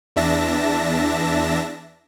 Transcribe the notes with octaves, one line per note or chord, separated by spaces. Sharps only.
E2 D4 E5 A5 A#6